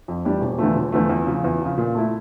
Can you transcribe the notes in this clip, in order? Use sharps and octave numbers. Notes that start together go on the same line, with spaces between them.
F2
E3 G3 D4 G4
E1
E2 D3 F3 A3
E1
E2 D3 F3 A3
E2
C#3 F3
E2
C#3 F3
A#2
A3 E4